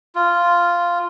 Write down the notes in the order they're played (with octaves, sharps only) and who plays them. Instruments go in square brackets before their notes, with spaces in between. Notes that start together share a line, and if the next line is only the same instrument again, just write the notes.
[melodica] F4